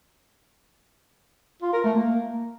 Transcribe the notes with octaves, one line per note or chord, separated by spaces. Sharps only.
F4
A#4
A3
A#3